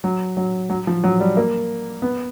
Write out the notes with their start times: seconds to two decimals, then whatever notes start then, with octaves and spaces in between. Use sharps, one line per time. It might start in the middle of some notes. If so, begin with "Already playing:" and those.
0.04 F#3
0.37 F#3
0.70 F#3
0.87 F3
1.04 F#3
1.20 G3
1.37 A#3
2.02 B3